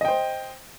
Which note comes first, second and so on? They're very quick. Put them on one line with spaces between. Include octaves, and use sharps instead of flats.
D#5 G5 C5